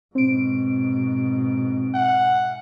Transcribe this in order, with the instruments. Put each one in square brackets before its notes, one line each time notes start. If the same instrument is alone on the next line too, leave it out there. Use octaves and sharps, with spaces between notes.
[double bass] G#2 B2 [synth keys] C4 D7
[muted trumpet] F#5